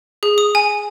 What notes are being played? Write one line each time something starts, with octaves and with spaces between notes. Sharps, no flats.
G#4
D#6
G#5